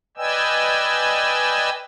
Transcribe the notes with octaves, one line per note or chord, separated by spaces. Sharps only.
B4 D5 D#5 G5 G#5 E6